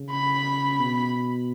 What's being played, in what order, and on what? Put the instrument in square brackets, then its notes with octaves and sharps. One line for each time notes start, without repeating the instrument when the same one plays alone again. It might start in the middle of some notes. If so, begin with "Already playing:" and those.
Already playing: [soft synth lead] C#3
[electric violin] B5
[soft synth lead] B2